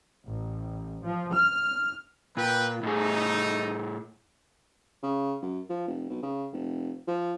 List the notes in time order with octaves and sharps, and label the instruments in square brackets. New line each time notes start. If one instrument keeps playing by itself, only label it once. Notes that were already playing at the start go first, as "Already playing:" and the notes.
[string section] A1
F3
F6
[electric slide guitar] A#2 [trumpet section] B4 G5
[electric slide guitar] A2 G#4 [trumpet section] A3 D#4
[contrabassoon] C#3
F#2
F3
F1
B1
C#3
F1
F3